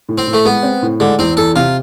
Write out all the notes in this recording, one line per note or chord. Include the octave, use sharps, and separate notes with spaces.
A2
C4
A2
A3
G#3 B3
C4
A2
D3 G#3
E2 C4
E2 A4
C3 F4